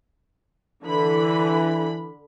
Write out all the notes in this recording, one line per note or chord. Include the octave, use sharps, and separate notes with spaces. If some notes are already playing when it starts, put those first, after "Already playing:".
D3 E3 B5